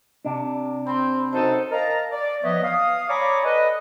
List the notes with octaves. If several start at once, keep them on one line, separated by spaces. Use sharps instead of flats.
C3 D4
C4 B5 C6
F#2 D#4 A4 C5
A#4 D#5 F5 A5 A#5
D5
F3 B3 B4 C#5 D#5 E5
F5 D#6
C#5 D5 G#5 A#5 B5 D6
A4 B4 D#5